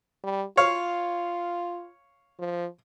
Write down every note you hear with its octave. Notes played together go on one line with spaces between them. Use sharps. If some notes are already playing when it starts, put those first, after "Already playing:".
G3
F4 C#5 F5
F3